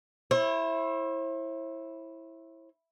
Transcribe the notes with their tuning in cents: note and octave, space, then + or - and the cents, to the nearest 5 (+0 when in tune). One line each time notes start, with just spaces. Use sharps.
E4 +0 C5 +45